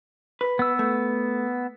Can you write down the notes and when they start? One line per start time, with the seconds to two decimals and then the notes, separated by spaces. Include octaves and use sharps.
0.41 B4
0.59 B3 E6
0.79 A3